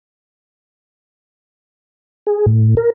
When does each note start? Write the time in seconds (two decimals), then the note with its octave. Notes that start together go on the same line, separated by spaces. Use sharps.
2.27 G#4
2.46 A2
2.77 A#4